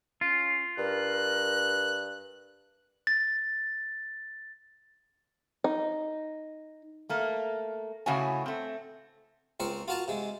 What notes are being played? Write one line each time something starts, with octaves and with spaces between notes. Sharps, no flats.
C#4 F4
G2 A#4 F#6
A6
D#4
A3 A#3
A2 C#3 E4 F#4 C#5 G#5
A3 C4
C#2 C4 A#4 C#6
F4 F#4 A#4 A5
C3 G#3